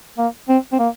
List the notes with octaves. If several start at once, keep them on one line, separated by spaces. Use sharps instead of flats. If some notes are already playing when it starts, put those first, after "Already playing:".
A#3
C4
C4
A#3